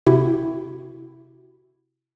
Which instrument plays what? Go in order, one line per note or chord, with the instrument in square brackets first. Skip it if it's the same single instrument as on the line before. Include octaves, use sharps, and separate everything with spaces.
[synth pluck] C3 E4 F#4 G4